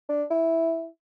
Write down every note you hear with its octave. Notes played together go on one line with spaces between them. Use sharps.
D4
E4